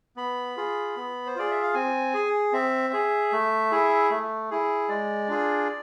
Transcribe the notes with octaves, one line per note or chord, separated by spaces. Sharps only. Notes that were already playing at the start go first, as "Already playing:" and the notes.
B3 B5
F4 G#4
B3
C5
F4 G#4 D5
E5
F5
C4 G#5
G#4
C4 E5
G#4
A3
E4 G#4
A3
E4 G#4
G#3 D5
D4 F4 G#4